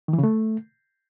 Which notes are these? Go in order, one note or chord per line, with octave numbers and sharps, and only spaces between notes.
D#3
E3
C#3
A3